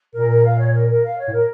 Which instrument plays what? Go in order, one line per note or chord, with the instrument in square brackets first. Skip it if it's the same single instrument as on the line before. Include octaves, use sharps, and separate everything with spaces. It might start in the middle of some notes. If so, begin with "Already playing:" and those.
[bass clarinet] A#2 [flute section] A#4
[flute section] A#4
F5
C#5
A#4
A#4
F5
C#5
[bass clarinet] A2
[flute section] A#4